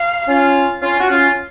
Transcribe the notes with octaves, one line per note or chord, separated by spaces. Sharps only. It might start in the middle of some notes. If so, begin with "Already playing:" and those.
Already playing: F5
C#4 F4
C#4 F4
F#4
C#4 F4